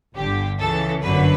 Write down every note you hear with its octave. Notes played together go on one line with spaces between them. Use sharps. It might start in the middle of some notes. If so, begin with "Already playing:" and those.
G1 G2 D3 G4
C#2 C#3 E3 A4
G1 F#2 D3 F#3 B4